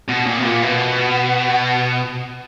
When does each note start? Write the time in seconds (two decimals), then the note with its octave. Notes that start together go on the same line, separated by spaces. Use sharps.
0.09 B2
0.26 A#2
0.39 B2
0.44 A#2
0.63 B2